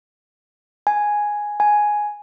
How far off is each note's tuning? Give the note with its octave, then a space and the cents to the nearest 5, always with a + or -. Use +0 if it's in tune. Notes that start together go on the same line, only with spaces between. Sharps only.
G#5 +0
G#5 +5